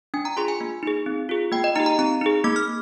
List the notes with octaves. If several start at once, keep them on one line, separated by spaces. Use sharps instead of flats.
D4 G#5
A#5
F4 G#4 C6
G#5
A#3
D#4 G#4
C4
F4 G#4
A#3 G5
D#5
D#4 G4 A#5
A#5
C4 A#5
D#4 G#4
A#3 D6
F6